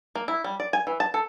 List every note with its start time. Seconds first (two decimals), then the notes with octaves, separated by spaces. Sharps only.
0.15 A#3
0.28 E4
0.44 G3
0.60 D5
0.73 G#5
0.87 E3
1.00 A5
1.14 A4